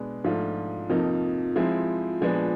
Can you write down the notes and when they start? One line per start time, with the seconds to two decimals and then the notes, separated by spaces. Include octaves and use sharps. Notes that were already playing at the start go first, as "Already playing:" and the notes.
Already playing: B2 G#3 B3 D4
0.24 G#2 F3 A3 D4 F4
0.89 F2 C3 F3 A#3 D#4
1.56 F3 G#3 C4 E4
2.21 A#2 F3 G#3 B3 D4